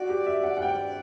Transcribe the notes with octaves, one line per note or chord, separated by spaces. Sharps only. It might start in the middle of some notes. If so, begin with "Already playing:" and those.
Already playing: F#4 D5
G4
E5
F#5
F#5
G5